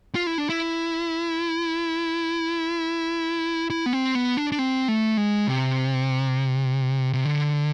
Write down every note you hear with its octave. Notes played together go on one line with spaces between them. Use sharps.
F4
E4
D4
E4
E4
B3
C4
B3
D4
D4
C4
A3
G#3
C3
C3
D3